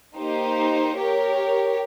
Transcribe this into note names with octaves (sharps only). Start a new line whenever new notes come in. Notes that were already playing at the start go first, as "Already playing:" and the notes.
A#3 D#4 G4 C5
G4 A#4 C#5